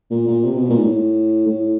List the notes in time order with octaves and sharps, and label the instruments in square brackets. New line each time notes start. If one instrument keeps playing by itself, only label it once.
[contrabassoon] A#2
A#2
C3
B2
A#2
G#2
A2
A2